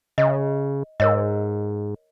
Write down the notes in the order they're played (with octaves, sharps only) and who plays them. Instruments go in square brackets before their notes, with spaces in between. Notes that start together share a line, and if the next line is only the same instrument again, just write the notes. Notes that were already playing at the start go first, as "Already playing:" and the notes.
[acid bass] C#3 [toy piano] D#5
[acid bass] G#2 [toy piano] A#4 C#5 D#5